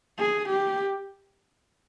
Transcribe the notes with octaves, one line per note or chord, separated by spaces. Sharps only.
G#4
G4